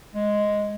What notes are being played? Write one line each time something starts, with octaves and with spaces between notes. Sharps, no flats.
G#3